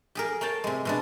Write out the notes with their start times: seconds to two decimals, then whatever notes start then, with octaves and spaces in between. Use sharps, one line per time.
0.15 G4 G#4 A#4
0.41 A#3 C#5 G5 A5
0.64 C3 G#3
0.85 B2 G#3 D4